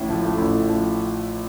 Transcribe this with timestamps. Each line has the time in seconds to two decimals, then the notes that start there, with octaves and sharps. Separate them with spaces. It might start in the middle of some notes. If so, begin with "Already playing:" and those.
Already playing: A1 A2
0.09 F3
0.23 A3
0.38 A1
0.53 A2
0.68 F3